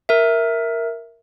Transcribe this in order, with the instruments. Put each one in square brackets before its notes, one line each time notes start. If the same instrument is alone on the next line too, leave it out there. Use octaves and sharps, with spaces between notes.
[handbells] A#4 E5